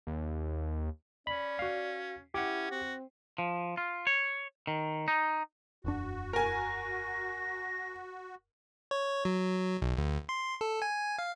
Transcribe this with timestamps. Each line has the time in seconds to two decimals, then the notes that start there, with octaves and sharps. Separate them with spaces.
0.07 D#2
1.27 C#4 D5 B5
1.59 F#4 F5
2.34 C#4 E4 G4 F#5
2.71 C4 F#4
3.38 F3
3.77 F4
4.07 C#5
4.67 D#3
5.08 D#4
5.85 E1 F#2 D4 F#4
6.33 A#4 G#5 A#6
8.91 C#5
9.25 F#3
9.82 B1
9.97 D2
10.29 C6
10.61 A4
10.82 G#5
11.18 F5